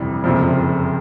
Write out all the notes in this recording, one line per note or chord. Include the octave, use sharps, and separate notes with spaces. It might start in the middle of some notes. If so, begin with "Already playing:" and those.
Already playing: G1 F2 C3 E3 G3
F#1 F2 C3 F3